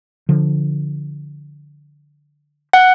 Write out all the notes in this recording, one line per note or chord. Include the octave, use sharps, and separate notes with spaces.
D3 F3
F#5